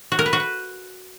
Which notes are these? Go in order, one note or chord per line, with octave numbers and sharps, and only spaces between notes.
F#4
A#4
B4
F#4
B4